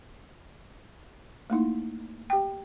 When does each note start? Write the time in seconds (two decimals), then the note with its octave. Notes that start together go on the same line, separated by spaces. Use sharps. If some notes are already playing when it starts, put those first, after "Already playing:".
1.50 A3 A#3 D#4 E4
2.30 G4 G5